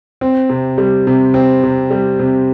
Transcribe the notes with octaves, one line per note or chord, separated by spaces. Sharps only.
C4
C3
G3
C3
C4
C3
G3
C3